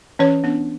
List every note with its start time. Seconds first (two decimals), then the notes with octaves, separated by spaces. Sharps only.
0.19 E3 C#4 C#5
0.44 B3 D4